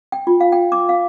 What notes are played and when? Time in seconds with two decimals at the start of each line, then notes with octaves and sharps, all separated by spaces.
0.12 G5
0.27 F4
0.40 F5
0.52 G5
0.72 D6
0.89 F5